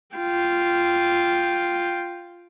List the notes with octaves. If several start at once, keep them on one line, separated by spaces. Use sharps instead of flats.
F4 G5